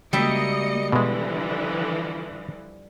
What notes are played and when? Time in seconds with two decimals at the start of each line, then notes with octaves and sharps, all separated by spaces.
0.13 C#3 G3 G#3 A#3 F#4 D#5 E5 C#7
0.92 B2 D3 E3 F3 G#3 B4 C6